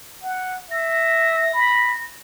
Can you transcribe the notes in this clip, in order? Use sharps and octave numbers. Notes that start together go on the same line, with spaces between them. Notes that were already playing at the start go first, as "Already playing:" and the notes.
F#5
E5 A#6
B5